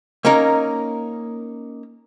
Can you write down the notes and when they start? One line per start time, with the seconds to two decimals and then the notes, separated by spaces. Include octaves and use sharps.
0.25 A#3 C#4 D#4 A#4